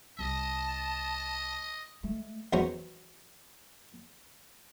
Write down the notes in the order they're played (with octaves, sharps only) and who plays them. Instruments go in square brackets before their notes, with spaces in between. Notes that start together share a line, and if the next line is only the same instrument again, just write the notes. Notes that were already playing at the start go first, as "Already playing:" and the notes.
[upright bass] C2 E4 [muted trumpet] D#5 [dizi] A5
[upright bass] G#3 A3
[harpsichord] E2 F#3 G#3 C#4 C5 A#5